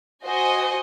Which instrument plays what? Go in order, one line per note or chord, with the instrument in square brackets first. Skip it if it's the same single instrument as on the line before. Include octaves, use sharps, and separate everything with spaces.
[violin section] F#4 C5 D#5 G#5